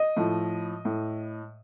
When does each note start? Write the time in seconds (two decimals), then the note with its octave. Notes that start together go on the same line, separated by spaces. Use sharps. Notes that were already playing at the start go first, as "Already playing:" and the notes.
Already playing: D#5
0.17 A2 F3
0.85 A2